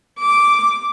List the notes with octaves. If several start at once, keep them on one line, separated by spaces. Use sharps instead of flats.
D6